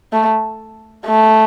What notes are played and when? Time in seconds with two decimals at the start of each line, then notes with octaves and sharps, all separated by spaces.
0.12 A3
1.05 A3